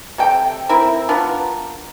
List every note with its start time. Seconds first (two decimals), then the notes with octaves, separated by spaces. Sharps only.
0.18 C3 A4 G5
0.69 C4 E4 A#4 E5
1.09 B3 D4 F4 A#4